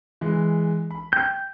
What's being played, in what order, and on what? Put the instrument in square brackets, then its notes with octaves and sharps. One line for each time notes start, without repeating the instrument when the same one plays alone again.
[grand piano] E3 G#3
B5
[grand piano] G5 [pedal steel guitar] G6